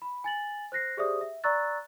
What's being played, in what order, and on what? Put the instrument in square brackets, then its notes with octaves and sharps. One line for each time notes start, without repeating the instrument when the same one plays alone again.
[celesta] B5
G#5 A6 F#7
C5 F#6 A#6 C7
G4 G#4 C5 D5 E5 D#6
E5
D5 A#5 C#6 E6 F#6 A6